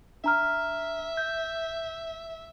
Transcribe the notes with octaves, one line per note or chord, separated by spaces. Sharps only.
D4 E5 A#5 F6
G6